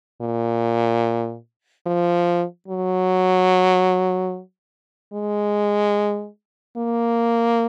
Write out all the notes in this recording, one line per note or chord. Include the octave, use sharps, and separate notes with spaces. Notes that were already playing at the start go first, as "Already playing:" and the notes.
A#2
F3
F#3
G#3
A#3